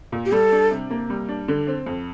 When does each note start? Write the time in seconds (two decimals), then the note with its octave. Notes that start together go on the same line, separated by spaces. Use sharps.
0.12 A#2
0.26 G4
0.32 G3 A4
0.52 D4
0.71 C3
0.90 A#3
1.10 G3
1.29 D4
1.48 D3
1.67 C4
1.86 F2